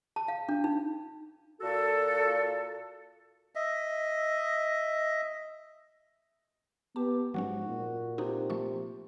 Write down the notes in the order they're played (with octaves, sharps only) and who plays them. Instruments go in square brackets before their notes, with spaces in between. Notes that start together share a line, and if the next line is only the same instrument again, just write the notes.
[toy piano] A5
F5
D4
D#4
[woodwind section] A#2 F#4 A4
[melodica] D#5 E5
[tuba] B3 [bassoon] G4 [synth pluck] A5
[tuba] G#2 [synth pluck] F3 F#3 C#4 [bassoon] F#4
[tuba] A#2
[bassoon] C3 [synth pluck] D#4 F#4
[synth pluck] F3 A3 C#6